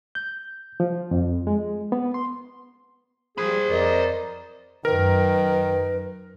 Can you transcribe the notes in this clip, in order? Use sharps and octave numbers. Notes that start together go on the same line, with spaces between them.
G6
F3
F2
G#3
B3
C6
F3 G3 G#4 C5 B5
F2 A#4 D5 D#5
F#2 D#3 A#4 B4